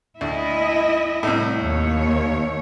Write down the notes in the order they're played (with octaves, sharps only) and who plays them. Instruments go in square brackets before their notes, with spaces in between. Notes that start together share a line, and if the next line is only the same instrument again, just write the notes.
[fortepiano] D2 [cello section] E4 D#5
[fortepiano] C2 A2
[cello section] D#2 C#5